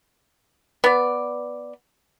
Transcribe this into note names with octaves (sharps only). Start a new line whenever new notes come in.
B3 D5